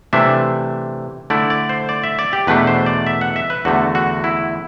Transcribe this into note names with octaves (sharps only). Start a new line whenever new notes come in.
C3 E3 A3 D4 E5
D3 A3 E4 D5
D5
C5
D5
E5
D5
G4
E2 B2 A3 D4 B4
C5
D5
E5
F#5
E5
B4
E2 D3 A3 F#4
F#4
E4